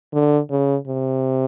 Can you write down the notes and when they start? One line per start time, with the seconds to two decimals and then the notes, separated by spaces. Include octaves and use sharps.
0.13 D3
0.50 C#3
0.87 C3